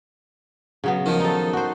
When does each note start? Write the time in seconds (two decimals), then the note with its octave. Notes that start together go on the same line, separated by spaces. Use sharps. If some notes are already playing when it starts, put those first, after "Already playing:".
0.84 C#3 F#3 B3
1.06 D#3 F3
1.20 D#4 A4
1.53 F#4 C5